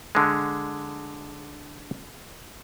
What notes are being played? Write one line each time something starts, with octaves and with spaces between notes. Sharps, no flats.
D3 G#3